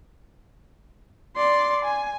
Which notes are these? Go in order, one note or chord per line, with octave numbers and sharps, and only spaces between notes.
D5 C6
G#5